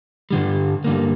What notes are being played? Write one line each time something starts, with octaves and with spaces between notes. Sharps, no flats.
G2 D3 G3
G2 D3 G3 A#3